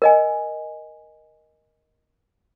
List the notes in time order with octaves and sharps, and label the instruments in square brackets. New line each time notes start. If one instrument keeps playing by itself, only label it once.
[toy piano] A#4 D#5 G#5